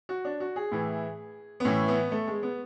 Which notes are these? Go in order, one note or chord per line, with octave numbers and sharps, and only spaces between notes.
F#4
D4
F#4
G#4
A2 E3
B3
A2 E3 C#4
B3
A3
G#3
B3